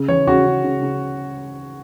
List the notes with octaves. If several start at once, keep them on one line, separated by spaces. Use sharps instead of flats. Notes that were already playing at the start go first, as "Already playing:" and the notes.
Already playing: C#3
E3 C#5
C#3 F#4
C#3
C#3
C#3